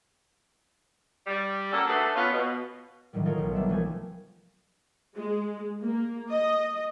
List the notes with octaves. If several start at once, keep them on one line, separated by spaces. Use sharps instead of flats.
G3
A#3 C#4 F#4 A4
A3 D4 F#4 G#4 A4 B4
B3 C#4 F4
B2
A2 D3 D#3 F#3 G3
D#4 F4 A4 A#4 C#5 F5
B1 C#7
F#3 G3 A#3 B3 D4 E5
C2 F3 A3 F4 G#5
G#3
A#3
D#5